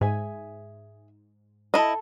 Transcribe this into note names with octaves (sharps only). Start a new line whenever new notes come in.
G#2 G#4 E5 G#5
E4 A4 D#5 A5